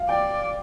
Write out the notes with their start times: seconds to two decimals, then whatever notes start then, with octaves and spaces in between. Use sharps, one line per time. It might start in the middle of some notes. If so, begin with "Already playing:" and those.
Already playing: F5
0.09 D5 G5